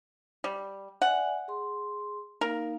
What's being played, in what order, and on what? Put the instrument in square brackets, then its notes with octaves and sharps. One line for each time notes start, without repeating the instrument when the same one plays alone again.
[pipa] G3
[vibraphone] D5 E5 G#5 [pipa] F#5
[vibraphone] G#4 C6
[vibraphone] A#3 D#4 F5 [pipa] A#4